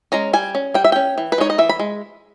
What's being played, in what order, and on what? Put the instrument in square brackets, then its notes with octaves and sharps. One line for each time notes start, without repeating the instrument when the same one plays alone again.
[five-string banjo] G#3 C#4 A#5
G3 G#5
C#4
G3 G5
E5
C#4 G5
E3
B4
G#3 D#4 C#5
D#5
E3 E5
B5
G#3